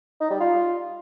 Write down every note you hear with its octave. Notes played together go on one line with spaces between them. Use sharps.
D#4
G3
F4